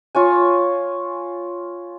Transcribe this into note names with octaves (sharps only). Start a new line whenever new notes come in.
F4 C#5 G#5